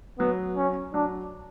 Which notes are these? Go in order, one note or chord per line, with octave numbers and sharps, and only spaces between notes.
F#3 B3
C#4
F#3 D4